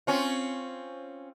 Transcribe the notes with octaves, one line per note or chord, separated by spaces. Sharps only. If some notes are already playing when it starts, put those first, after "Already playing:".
C4 C#4 F4